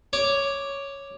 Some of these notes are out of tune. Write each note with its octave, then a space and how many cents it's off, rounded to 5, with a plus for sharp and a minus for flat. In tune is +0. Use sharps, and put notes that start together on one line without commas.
C#5 +0 D6 +0